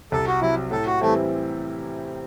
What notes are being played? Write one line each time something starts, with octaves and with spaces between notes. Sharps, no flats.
C2 A4
F#4
C3 F#3 E4
A2 A4
F#4
E3 G3 A3 C4 E4